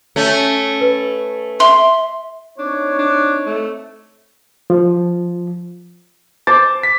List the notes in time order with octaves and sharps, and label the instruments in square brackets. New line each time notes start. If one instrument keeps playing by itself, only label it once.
[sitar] A3 C#4
[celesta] B4
[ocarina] E5 [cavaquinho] C6
[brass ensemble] C4 D#4 C#5 [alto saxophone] D4
[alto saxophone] D4
A3
[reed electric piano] F3
[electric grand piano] C5 A6 [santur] D6
[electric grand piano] B6